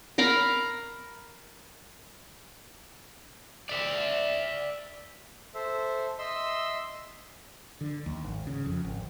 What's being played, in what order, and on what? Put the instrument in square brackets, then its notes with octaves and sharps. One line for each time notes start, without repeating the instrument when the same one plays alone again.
[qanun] A#4 F5 A#5 B5
[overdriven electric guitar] D5 E5
[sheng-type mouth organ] A4 C5 E5
D#5 E5 C6 E6
[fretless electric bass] D3
D#2
G#1
C#3
F2
G#1